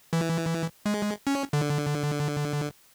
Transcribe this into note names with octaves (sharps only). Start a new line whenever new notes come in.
E3
G#3
C#4
D3